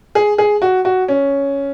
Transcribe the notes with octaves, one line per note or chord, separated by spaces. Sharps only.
G#4
G#4
F#4
F#4
C#4